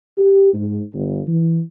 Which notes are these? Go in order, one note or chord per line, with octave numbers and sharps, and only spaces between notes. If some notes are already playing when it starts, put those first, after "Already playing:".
G4
G#2
G1
E3